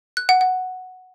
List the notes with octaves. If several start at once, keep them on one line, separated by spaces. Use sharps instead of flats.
F#6
F#5
F#5